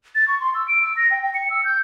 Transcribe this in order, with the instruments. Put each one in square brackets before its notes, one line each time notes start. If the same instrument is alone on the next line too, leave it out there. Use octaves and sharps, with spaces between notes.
[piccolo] A6
C#6
C6
E6
D7
E6
A#6
G5
G5
C#7
E6
G6